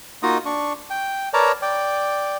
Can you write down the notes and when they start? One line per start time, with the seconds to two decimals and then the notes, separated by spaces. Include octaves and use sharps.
0.23 A#3 D#4 F4 F#4 D#5 D#6
0.46 D4 C#6
0.90 G5
1.34 A#4 B4 C#5 D5 A5 A#5
1.62 D5 G5